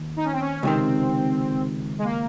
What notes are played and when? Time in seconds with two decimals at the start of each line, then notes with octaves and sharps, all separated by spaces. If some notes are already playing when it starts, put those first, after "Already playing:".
Already playing: D#2
0.17 D#4
0.24 C#4
0.33 C4
0.41 C#4
0.63 C#2 C3 D#3 C4
1.98 G#3
2.04 A#3